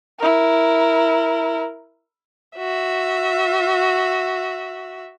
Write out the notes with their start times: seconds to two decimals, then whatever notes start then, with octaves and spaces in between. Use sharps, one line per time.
0.19 E4 A#4
2.57 F#4 E5